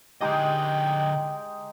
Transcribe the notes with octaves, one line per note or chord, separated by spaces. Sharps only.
D3 G#3 D#4 G4 D#5 G5